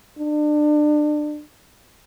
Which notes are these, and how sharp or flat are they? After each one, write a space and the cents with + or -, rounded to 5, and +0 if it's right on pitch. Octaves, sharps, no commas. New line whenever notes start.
D4 +30